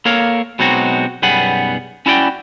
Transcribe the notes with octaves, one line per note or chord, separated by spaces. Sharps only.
A#3 A4 A#4 C#5 F5
B2 F#3 G#3 C4 D#4 F#4
B1 F#2 G3 B3 G#4 F#5
C#4 E4 F#4 D5 F#5 G5